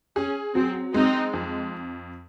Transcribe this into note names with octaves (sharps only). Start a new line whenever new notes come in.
C#4 G#4
F#3 C4
G#3 C4 D#4
F2